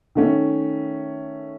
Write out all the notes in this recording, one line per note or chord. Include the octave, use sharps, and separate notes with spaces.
D#3 A3 C#4